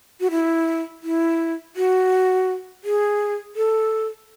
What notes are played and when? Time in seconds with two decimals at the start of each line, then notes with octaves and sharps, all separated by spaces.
0.20 F#4
0.31 E4
1.03 E4
1.76 F#4
2.84 G#4
3.56 A4